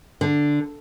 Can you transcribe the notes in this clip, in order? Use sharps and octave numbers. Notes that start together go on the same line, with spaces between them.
D3